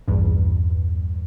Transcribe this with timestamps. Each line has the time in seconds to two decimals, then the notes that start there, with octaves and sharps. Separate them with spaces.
0.08 A#1 E2 G2